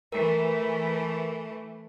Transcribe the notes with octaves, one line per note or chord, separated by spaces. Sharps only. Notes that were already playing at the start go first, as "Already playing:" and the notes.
E3 A3 A#4